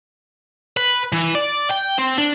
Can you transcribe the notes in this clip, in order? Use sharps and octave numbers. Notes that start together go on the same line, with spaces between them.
B4
E3
D5
G5
C4
D4